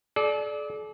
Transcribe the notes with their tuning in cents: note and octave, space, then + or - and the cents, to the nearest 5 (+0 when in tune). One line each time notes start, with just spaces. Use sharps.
A4 -45 D5 +0